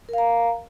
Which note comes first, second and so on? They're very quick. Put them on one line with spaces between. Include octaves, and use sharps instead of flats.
A#4 F5 A#5